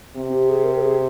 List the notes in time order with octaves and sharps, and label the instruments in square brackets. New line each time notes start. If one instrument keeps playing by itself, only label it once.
[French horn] C3 [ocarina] C4
[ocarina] G4
G#4
A#4
A#4
G#4